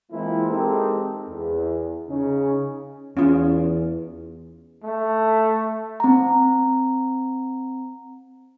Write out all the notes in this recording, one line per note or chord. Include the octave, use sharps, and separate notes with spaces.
E3 G#3 A#3 C4 E4 F4
G#3 C4 D#4 G4 A4 A#4
E2
C#3 C#4 D#4
E2 C#4 F4
A3
C4 A#5